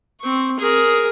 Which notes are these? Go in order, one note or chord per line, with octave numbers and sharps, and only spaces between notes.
C4 C#6
G#4 A#4